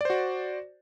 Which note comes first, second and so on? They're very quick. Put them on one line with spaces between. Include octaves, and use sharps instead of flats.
D5 C5 F#4